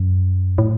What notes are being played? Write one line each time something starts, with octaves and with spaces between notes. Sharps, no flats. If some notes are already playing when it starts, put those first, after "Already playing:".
Already playing: F#2
A2